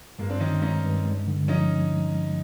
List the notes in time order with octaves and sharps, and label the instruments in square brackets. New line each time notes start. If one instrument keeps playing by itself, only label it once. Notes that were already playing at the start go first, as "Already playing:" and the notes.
[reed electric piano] G2 [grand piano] G#3 A#3
[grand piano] C4 D4
[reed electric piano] D#3 [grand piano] C#4 D#4
[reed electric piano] G#3 [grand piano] C#4 D#4
[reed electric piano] G2
G#3
D3
[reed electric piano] F3 [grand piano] C#4 D#4